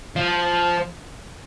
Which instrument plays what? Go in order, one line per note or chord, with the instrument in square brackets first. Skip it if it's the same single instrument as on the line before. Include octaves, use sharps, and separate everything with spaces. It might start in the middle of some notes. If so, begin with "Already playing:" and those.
[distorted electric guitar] F3